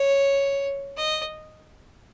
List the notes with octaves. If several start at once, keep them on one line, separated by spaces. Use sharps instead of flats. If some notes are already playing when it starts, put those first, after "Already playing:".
Already playing: C#5
D#5